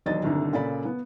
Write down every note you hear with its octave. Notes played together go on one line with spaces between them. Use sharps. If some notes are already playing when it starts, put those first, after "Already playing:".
E1 D#2 F#3 D4 D#5 A6
G1 C2 D3 D#3
A#2 C#3 A4 D5 B5
B3